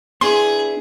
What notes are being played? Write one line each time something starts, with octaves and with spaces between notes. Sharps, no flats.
B3 D4 E4 G#4 C6